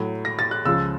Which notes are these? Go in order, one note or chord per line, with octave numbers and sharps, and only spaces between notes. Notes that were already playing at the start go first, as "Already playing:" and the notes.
Already playing: A2 F#3
A#6
A6
F#6
C#2 C#3 F3 E6